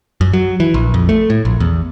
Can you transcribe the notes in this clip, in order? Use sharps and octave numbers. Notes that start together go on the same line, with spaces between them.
F#2
F#3
E3
A#1
F2
A3
A2
A#1
E2